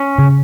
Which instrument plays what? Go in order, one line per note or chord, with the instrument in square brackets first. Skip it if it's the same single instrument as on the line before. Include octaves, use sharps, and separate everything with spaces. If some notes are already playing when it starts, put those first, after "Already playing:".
Already playing: [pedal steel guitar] C#4
[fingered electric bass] C#3